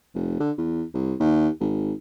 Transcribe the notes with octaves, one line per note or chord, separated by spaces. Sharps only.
F1
D3
E2
C2
D#2
G#1